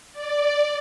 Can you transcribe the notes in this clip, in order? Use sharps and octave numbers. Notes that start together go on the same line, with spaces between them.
D5